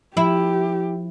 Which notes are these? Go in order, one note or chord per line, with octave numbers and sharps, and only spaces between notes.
F3 E4 G4